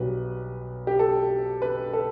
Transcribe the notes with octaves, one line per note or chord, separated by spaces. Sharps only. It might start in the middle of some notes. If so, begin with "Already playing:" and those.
Already playing: B1 B2 G3 B4
G4
A4
B4
A4